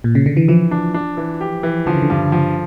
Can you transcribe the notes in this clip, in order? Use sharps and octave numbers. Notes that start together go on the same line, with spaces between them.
A#2
C#3
D3
E3
E3 F3
D4
D4
E3
G4
E3
D3 F3
C#3
D3
G2
F3